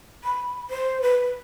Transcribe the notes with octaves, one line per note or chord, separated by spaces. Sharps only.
B5
C5
B4